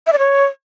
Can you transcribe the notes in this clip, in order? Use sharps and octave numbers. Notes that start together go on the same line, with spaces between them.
E5
D5
C#5